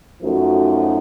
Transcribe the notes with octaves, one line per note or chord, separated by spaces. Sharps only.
F#2 F3 A3 D#4 F#4